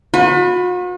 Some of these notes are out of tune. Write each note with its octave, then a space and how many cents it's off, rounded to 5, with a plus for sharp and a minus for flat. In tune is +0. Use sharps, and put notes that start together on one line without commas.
F#4 -45 B4 +10